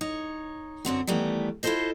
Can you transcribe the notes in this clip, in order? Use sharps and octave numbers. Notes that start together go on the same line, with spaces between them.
D#4 C#5
F#2 D3 C4 F#4
D#3 E3 G3 A3 B3
E4 F4 G4 A4 C5 D#5